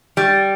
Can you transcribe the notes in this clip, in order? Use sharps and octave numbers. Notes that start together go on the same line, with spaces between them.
G3